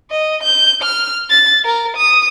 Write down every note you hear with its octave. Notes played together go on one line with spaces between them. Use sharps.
D#5
G6
F6
A6
A#4
D#6